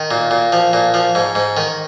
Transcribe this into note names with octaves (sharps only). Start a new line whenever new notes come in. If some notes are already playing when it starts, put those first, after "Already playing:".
Already playing: D#3
A#2
A#2
F3
A#2
F3
G#2
G#2
D#3